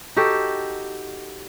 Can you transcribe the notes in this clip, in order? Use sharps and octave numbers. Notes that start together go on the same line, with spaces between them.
D#4 F#4 G4 A4